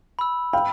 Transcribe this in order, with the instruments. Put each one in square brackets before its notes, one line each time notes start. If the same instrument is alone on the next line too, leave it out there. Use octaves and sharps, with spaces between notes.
[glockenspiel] B5 E6
[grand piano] F5 G5 [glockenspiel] B5